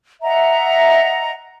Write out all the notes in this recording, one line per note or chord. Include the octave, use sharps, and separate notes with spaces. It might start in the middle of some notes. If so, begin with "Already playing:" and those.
D#5 E5 F#5 A#5